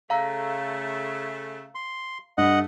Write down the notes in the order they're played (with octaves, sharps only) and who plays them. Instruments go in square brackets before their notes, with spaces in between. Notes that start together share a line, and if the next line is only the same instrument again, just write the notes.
[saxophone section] C#3 A3 [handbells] F5 A#5 E6
[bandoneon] C6
[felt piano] G2 [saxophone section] A3 [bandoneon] D#5 F#5